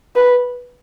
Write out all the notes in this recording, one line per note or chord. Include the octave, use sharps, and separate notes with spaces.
B4